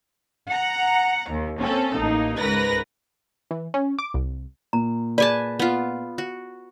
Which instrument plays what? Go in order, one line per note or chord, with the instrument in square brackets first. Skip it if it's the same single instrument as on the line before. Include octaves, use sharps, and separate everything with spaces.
[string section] F#5 A#5
D#2
A#3 C4 C#4 A4
A1 A#3 D#4
C#2 G#2 A#4 B4 A#6
[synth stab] E3
C#4
D6
C2
[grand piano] A#2 [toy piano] A#5
[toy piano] G#4 D5 [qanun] B4 G#5 A5
[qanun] B3 F4
F#4